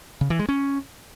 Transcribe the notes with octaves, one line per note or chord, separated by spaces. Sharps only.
C#3
E3
G#3
C#4